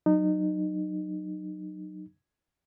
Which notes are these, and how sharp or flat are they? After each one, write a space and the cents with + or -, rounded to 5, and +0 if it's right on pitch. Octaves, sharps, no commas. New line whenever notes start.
F#3 +0 D#4 -25